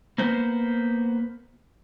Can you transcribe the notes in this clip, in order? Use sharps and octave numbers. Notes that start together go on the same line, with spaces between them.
A#3 B3 C5